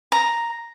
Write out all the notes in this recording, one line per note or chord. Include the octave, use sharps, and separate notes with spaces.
A#5